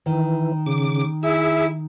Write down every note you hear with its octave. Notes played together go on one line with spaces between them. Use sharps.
D#3 E3
C#3 D6
E4 G#4 E5